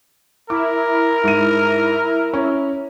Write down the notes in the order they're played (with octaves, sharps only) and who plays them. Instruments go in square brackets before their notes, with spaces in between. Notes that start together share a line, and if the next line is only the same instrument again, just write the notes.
[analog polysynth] E4 [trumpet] A#4 [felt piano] D6
[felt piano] G#2 D#7
C#4